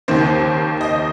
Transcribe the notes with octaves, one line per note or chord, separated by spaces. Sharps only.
D#2 D#3 A#3 C5
D#5